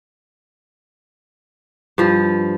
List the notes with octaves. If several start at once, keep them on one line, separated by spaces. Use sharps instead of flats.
G2 F3